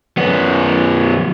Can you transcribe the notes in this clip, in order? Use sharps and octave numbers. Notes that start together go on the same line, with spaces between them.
F#2 B3